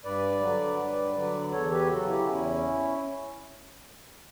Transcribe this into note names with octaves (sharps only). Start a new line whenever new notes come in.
G2 B4 D5
D3 F#3
G2
D3 F#3
E2 A4 C#5
G4 B4
C#3 F#3 F#4 A4
E4 G4
E2 C#4 E4